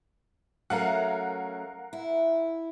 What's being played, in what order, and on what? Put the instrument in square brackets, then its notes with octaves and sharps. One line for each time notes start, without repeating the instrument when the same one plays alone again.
[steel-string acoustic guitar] F#3 A3 C#4 [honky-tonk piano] A#4 F5 F#5
[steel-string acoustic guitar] E4